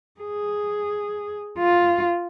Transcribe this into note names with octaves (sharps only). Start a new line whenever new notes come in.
G#4
F4